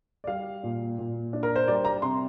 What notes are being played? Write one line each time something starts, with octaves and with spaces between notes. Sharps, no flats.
D5
G3 F5
A#2
A#2
D4
A#4
C5
G3 D5
A#5
C3 C6